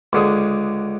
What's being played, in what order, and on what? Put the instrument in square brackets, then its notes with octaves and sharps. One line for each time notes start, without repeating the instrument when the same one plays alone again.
[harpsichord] C#2 D3 G#4